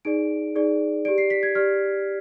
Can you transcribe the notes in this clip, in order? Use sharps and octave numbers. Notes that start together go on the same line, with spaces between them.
D#4 G#4 D5 D7
D#4 G#4 D5
G4 D5 D7
C7
B6
G#6
G4 D5 F6